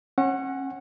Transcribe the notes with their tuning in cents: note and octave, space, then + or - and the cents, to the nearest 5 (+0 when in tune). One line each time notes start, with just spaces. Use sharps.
C#4 -35 F#5 +0